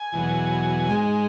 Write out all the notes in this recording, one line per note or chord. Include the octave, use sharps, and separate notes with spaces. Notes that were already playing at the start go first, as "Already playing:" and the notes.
Already playing: G#5
E2 B2 F#3
G#2 G#3